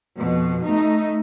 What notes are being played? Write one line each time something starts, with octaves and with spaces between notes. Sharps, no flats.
F2 B2
A3 D#4